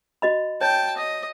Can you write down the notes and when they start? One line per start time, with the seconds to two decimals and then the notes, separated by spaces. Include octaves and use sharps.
0.22 F#4 D#5 B5
0.61 C#5 G5 A5
0.97 D#5